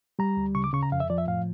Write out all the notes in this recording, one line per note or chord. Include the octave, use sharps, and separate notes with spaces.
G3 A#5
D2
C#3 C#6
D6
C#3 C#6
A#5
F2 F5
E5
F3 D5
E5
A2 F5